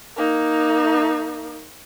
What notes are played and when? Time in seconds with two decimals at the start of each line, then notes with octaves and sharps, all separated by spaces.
0.17 A#3 D#4